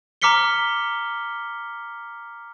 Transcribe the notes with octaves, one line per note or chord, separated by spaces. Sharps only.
A#5 D6 F6 B6 C#7 G7